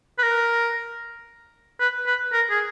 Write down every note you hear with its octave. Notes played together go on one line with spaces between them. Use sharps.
B4
A#4
B4
B4
A#4
G#4